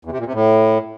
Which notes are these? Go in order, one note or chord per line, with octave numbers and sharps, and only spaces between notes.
E2
C3
A#2
C3
A2